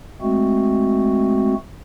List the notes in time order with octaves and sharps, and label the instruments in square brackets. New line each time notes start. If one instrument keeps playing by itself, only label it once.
[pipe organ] G#3 A3 C4 F#4